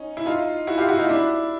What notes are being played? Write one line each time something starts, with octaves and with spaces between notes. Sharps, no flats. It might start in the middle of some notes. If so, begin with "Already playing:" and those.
Already playing: C#4 D#4
E4
D#4 F4
E4 F#4
F4 G4
E4 F#4
D#4 F4
D4 E4